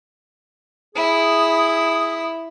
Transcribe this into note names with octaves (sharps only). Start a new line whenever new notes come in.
E4 G#4 D#6